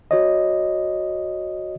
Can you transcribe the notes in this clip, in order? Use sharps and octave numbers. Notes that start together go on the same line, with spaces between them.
F#4 C#5 D#5